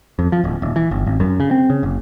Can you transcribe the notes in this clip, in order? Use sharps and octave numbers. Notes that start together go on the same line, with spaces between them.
F2
F3
D1
D#1
E3
G1
G#1
F#2
C#3
C4
C#3
F#1